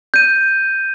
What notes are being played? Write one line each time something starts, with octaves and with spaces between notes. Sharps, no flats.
G6 D#7